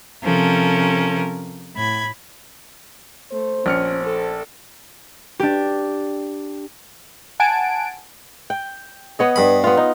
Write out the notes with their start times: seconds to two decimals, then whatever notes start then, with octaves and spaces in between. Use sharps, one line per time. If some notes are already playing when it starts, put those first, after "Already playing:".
0.23 C3 F3 C#4 A4 A#4
1.75 A2 B5 G#6
3.32 A3 C5
3.66 A#1 C#4 F6 C#7
4.03 A4
5.40 D4 G4
7.40 F#5 G#5 A5 D7
8.50 G5
9.19 B3 C#5 D#5
9.36 G2 B5
9.64 B3 F4
9.77 D#4